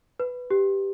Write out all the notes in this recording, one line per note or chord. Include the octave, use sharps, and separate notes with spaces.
B4
G4